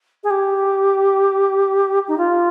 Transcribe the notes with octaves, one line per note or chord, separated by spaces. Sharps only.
G#4
G4
D#4
F4